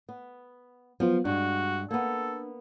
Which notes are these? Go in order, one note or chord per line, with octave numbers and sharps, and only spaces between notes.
B3
F3 F#3 B3 F4
G2 G#3 D4 F#4
A#3 B3 A4